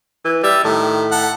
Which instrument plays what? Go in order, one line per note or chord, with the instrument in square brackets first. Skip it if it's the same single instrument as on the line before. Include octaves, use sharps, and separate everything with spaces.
[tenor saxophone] E3
[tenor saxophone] G3 [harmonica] E5
[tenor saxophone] A2 [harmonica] D#3
[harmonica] A4 F#5